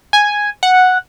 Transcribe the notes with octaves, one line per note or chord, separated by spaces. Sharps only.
G#5
F#5